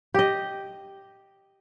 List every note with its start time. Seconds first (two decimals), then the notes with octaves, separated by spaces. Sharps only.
0.14 G4 D#5